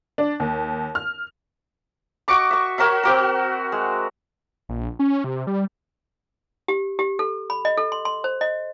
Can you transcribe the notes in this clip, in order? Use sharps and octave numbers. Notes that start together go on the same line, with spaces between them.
D4
D#2
F6
F#4 D#5 C#6 D6
E5 C#6
F#4 A#4 C#5 E5
C4 F#4 A#4
G#3
A#1
C#4
C3
G3
G4
G4
A4
B5
D#5
A4
C6
C6
C5
D#5